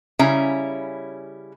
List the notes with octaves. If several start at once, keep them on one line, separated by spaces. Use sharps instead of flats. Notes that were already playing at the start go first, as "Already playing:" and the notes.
C#3 G3 C#4 E4 A#5